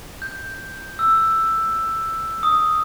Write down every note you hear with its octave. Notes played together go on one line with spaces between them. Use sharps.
G6
E6
D#6